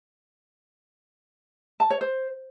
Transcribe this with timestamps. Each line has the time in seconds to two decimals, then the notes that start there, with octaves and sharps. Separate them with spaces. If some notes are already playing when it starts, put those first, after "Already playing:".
1.80 A5
1.90 C#5
2.01 C5